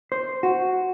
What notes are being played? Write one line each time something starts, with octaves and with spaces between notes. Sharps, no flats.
C5
F#4